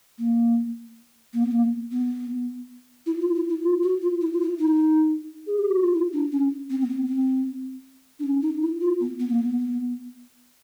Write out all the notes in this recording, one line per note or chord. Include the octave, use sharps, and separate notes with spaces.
A#3
A#3
B3
A#3
B3
E4
F4
E4
E4
F4
F#4
F4
E4
F4
E4
D#4
G#4
G4
F#4
F4
E4
D4
C#4
C4
B3
C4
C4
D4
C#4
D#4
E4
F4
B3
B3
A#3
B3